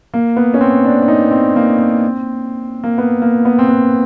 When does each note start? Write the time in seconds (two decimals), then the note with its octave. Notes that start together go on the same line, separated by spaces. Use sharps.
0.14 A#3
0.36 B3
0.54 C#4
0.61 C4
0.85 D4
1.02 D4
1.08 D#4
1.31 C4
1.56 A#3
1.79 C4
2.84 A#3
2.98 B3
3.22 A#3
3.45 B3
3.59 C4
3.68 B3